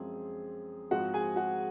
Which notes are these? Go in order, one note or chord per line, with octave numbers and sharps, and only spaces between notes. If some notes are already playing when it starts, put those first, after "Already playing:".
Already playing: F#2 F3 G#3 C4 G#4
G#2 F3 G#3 C4 F#4 F#5
G#4 G#5
F#4 F#5